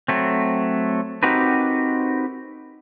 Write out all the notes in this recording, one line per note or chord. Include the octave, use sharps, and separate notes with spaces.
F#3 A3 C4
C4 D#4 F#4 G4 A#4 B4